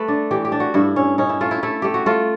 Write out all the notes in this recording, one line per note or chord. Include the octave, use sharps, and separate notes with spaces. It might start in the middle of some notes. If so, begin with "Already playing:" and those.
Already playing: A3 B4
D4
E3 G4
G4
D4
F#4
G2 E4
C#4
C#4 D#4
E4
A3 F4
E4
A3 E4
A3 G4
F#4
A3 F4